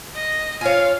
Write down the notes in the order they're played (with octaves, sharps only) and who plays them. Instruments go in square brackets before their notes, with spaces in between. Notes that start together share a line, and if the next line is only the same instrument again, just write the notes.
[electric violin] D#5
[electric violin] F4 F5 [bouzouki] C#5 G#5